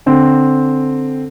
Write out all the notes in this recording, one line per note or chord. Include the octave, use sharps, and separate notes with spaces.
D3 C4